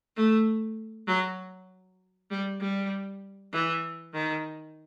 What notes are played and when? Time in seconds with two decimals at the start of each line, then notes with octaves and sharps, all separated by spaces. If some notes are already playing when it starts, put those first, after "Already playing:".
0.16 A3
1.07 F#3
2.31 G3
2.61 G3
3.53 E3
4.14 D#3